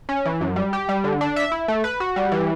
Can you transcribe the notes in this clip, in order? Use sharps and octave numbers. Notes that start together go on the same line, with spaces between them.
C#4
E3
F#2
G3
G4
G3
D3
D4
E5
E4
A3
B4
F#4
G3
E3